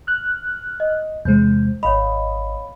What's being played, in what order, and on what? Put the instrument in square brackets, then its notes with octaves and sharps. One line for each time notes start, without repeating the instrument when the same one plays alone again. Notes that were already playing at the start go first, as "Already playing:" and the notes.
[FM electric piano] F6 F#6
[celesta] D#5
[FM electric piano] E2 C3 G#3 [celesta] C5 G6
[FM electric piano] G#1 D#5 [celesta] C#5 F5 B5